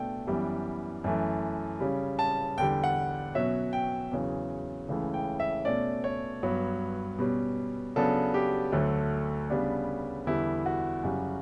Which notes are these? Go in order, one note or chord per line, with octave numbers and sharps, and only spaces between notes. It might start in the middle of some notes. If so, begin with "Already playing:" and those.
Already playing: B2 A3 D4 G5
F#2 E3 G3 B3
F#2 E3 A3
C#3 G3 C#4
A5
E2 D3 G3 G5
F#5
B2 F#3 C#4 E5
G5
E2 C#3 F#3
C#2 C#3 E3 A3
G5
E5
B2 A3 C#4 D5
C#5
G2 F#3 B3
B2 G3 C#4
C#3 F#3 B3 D4 A4
G4
D2 D3 F#3 A3
C#3 G3 B3 D4
E2 D3 G3 E4
F#4
F#2 C#3 G3